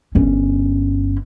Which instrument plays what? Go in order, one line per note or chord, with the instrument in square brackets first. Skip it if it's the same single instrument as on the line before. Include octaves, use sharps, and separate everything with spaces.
[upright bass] G1 C#4